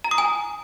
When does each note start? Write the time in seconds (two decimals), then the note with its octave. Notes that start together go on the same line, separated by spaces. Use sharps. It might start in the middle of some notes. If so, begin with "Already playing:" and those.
0.04 A#5
0.11 D#6
0.18 G#5